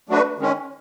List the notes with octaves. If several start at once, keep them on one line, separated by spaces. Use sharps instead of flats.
F#3 A3 D4 F#4 B4
D#3 G#3 C#4